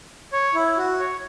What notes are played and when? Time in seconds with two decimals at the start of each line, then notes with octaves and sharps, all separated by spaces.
0.33 C#5
0.55 E4
0.78 F#4
1.00 C#5